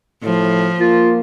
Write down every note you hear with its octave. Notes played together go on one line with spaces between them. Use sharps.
A2 F3
A#3 F4